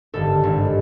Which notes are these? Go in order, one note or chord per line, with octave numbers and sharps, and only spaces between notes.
G#1 G2 D3 A4
G#1 G2 D3